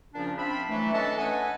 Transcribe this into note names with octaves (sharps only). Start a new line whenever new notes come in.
A#2 C#3 F3 C#4 D4
C4 D4 E5 F5 B5
E3 F#3 A3
C#4 D4 A4 B4 D#5 A5
A4 B4 D#5 F#5 G#5